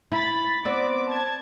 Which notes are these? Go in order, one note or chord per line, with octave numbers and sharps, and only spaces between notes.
E4 B5 A6
B3 C4 D5 D6
A5 G#6